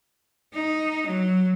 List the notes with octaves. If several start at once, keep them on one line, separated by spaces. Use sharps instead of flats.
D#4
F#3